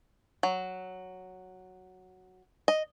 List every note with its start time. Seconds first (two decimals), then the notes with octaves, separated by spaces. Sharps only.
0.43 F#3
2.68 D#5